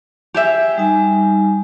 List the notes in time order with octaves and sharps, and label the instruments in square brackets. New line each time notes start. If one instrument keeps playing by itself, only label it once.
[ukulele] G4 G#4 E5
[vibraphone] G3 D#4 G#5